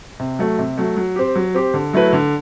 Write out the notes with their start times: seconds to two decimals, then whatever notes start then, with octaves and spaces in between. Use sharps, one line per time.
0.20 C3
0.39 F#3 A3
0.59 C3
0.78 F#3 A3
0.97 F#3
1.16 C4 G4
1.35 F#3
1.54 C4 G4
1.74 D3
1.93 F#3 A3 E4 B4
2.13 D3